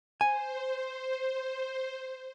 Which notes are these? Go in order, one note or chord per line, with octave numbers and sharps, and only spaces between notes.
C5 G#5